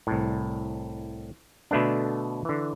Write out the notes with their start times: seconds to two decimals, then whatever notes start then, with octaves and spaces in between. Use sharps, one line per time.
0.07 C2 A2
1.71 B2 D3 A3 B3 D4
2.45 D3 E3